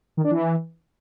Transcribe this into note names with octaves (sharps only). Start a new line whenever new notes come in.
D#3
D4
E3